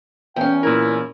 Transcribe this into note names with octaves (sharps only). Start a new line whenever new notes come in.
E2 C#4 G5
A#2 E4 A#4